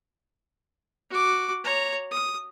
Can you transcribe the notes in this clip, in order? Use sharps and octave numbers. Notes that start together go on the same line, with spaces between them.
F#4 D6
C#5 A#5
D#6